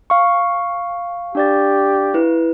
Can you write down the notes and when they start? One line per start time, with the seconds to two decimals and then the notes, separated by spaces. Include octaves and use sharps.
0.10 F5 C#6
1.35 D4 G4 D5 A6
2.14 E4 B4